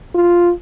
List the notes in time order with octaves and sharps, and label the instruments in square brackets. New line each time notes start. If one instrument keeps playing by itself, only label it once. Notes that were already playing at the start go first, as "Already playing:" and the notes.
[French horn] F4